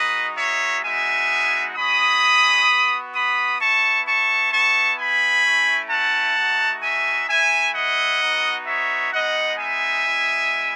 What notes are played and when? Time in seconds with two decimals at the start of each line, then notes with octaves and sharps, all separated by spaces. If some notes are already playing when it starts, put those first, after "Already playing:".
Already playing: G#3 D#4 F#4 B4 D#5
0.38 C#5 E5
0.84 G#3 B3 D#4 F#4 E5 G#5
1.76 G#3 C#4 F#4 B5 D#6
2.68 B3 F#4
3.14 B5 D#6
3.60 B3 E4 A5 C#6
4.07 A5 C#6
4.52 B3 E4 A5 C#6
4.99 G#5 B5
5.45 A3 C#4 E4
5.91 F#5 A5
6.37 A3 D#4 F#4
6.83 E5 G#5
7.29 A3 E4 E5 G#5
7.75 D#5 F#5
8.22 B3 D#4 F#4
8.67 C#5 E5
9.13 G#3 B3 D#4 D#5 F#5
9.60 E5 G#5
10.05 G#3 B3 E4